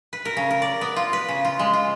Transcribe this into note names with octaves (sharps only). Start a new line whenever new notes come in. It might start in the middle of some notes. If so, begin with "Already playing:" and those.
B4
A#4
C#3
A#4
D5
B3
F4
B4
C#3
F4
G#3
F4